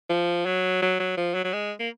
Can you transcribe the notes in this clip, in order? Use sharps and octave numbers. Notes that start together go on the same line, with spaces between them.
F3
F#3
F#3
F#3
F3
F#3
F#3
G#3
A#3